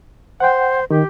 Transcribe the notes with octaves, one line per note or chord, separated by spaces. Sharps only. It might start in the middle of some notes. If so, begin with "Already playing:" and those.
C5 F#5 G5
D#3 G4